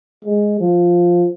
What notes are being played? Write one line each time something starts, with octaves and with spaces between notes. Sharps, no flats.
G#3
F3